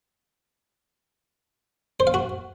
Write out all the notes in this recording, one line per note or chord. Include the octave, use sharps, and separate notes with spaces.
C5
F5
F#4